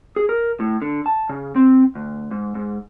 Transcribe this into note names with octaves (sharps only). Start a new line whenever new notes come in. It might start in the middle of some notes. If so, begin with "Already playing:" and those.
G#4
A#4
A2
D3
A5
C#3
C4
D2
G#2
G#2